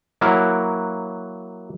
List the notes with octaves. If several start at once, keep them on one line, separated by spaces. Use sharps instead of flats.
F#3 A#3 E4 F#4 A#4